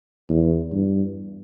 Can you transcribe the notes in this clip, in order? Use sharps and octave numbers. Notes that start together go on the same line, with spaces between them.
E2
G2